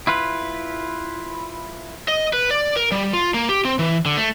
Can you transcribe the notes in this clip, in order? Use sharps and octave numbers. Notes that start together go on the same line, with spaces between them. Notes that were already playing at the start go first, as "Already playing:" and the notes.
E4 F4 B4
D#5
B4
D5
A#4
G3
F4
A#3
G4
C4
E3
D3
A3